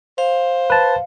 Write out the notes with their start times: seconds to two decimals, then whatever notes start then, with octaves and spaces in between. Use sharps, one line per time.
0.18 C5 F5
0.70 B4 A5